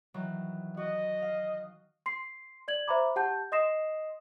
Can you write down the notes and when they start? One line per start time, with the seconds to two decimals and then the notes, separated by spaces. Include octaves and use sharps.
0.14 D#3 E3 F#3
0.77 F#4 D#5
1.22 F5
2.06 C6 C7
2.68 D5 G#6 F#7
2.88 C5 E5 A#5 B5 D6
3.16 G4 F#5 A5 G6
3.52 D#5 C6 D#6 A#6 C7 E7